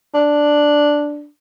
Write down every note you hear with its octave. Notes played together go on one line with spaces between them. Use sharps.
D4